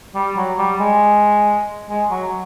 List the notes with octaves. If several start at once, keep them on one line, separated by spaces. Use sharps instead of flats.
G3
F#3
G3
G#3
G#3
F#3